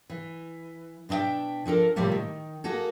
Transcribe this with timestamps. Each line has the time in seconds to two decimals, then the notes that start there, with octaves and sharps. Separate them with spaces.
0.10 E3
1.09 B2 D4 D#5 E5 G5
1.66 F3 D4 A4 A#4
1.96 A2 C3 F3 G3 A3 A#3
2.12 D#3
2.64 A#3 F#4 G#4 A4